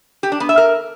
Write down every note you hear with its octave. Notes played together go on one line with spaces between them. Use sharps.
G4
D4
B3
E5
A#4